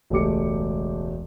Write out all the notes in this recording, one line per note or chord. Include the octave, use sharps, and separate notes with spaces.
E1 C#2 A3 G4 D6 C#7